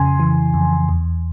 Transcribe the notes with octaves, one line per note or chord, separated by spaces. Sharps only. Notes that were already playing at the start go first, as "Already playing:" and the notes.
Already playing: F2 C#3 G#5 C6
E3
F2
E2